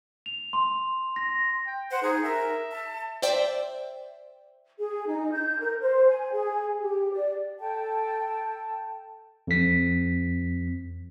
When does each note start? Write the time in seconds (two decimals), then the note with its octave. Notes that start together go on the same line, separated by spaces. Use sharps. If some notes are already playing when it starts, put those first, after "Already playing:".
0.26 F7
0.53 C6
1.16 A#6
1.66 G5
1.91 C5 F#5
2.03 D#4 G#4
2.24 A#4 E5
2.72 A5
3.22 C5 D5 E5 G5
4.79 G#4
5.07 D#4
5.32 G6
5.59 A#4
5.81 C5
6.08 G#5
6.32 G#4
6.78 G4
7.13 D5
7.59 A4 G5 A5
9.47 F2 B6